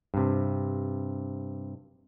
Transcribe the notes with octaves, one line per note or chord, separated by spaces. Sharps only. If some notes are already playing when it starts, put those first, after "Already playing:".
G2 C3